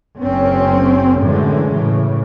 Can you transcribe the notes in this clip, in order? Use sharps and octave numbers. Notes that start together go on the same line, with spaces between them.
F#1 F#2 C4 C#4
F#2 A2 D3 E3 G#3
A2 C#3 E3